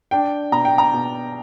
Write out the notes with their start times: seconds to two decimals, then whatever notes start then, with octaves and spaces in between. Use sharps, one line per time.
0.11 D4 G5
0.52 B2 A#5
0.65 G5
0.78 A#5
0.93 B2